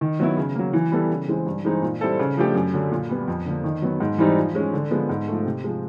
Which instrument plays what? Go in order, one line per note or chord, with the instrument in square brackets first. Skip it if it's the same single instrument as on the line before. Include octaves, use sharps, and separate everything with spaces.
[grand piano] D#3
F#3 B3 E4
C#3
F#3 A#3
E3
G3 B3 E4 A4
C#3
E3 G#3 C4
G2
E3 G#3 C4 D#4
A#2
G3 C4 E4 A4
C#3
F3 A3 D4 G4
F#2
D3 F#3
A#2
G3 B3
F2
D3 F3 A#3
D#3
F#3 B3
G#2
E3 G3 C4 D#4
F3
G#3 C#4
D3
F3 G#3 B3
G#2
F3 A3
C3
F3 G#3